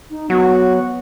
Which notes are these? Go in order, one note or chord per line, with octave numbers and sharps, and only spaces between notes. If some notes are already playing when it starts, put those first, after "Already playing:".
D#4
F#3 B3 F#4